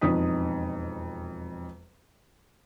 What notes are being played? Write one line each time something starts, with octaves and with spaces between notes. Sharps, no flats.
E1 F2 D#4 D#6 B6